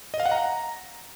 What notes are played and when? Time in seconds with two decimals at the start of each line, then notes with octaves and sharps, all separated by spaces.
0.14 D#5
0.20 F5
0.26 F#5
0.31 A#5